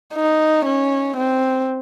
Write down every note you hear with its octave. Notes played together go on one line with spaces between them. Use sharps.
D#4
C#4
C4